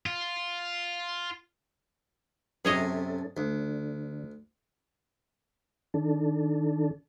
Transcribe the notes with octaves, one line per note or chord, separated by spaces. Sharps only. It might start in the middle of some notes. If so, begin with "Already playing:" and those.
F4
F#2 C3 C#4 G#4 A4 C#5 D#5
D2 D3
D#3 D4 A4